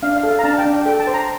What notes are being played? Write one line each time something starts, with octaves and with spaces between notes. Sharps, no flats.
D4 F5
F5
A4
F5
A#5
D4 A5
A5
G5
D4
G5
A4 G5
A5
C5
A#5